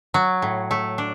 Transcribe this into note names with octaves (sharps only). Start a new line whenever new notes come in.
F#3
A2
A3
D4